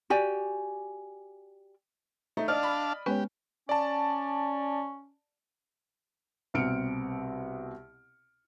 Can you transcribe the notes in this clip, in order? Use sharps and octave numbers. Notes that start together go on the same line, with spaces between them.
F#4 G4 D5 G#5
A3 D#4
D4 D5 D#5 F5 A5 F6
B5
G#3 B3 C#4 G4 B4 C#5
C#4 D5 A5
C2 B2 C4 F6 C#7 D7